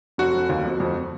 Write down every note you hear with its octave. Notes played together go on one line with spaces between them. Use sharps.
F1 F#4
F1
D#2
F2
F2